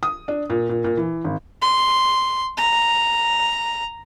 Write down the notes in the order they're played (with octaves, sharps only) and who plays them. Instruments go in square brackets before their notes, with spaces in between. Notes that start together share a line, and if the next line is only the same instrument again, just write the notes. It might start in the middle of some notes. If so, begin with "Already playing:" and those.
[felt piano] D#6
D4
A#2
A#2
A#2
E3
G#1
[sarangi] C6
A#5